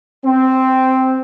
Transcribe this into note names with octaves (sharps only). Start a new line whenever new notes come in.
C4